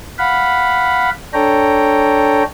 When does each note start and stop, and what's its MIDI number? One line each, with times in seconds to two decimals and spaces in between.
0.19 1.10 77
0.19 1.10 78
0.19 1.10 83
1.34 2.43 62
1.34 2.43 69
1.34 2.43 73
1.34 2.43 79
1.34 2.43 82